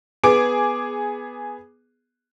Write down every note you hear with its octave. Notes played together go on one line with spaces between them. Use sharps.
B3 G#4 D6 D7